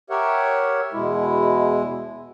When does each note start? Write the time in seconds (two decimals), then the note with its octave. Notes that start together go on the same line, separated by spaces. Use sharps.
0.10 G4 A#4 C#5 E5 F#5
0.93 E2 B2 G#3 E4